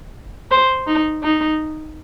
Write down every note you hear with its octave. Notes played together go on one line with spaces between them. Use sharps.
C5
D#4
D#4